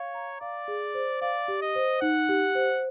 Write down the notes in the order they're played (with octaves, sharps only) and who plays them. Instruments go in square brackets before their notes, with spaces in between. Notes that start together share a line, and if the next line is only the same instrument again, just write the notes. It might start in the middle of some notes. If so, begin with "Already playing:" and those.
Already playing: [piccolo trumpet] C#5 [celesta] F5
[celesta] A#5
[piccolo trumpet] D5 [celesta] F5
[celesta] G#4
C5
[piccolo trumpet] D5 [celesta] F5
[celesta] G4
[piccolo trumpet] D#5
[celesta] C5
[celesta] D#4 [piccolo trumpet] F#5
[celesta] G4
C5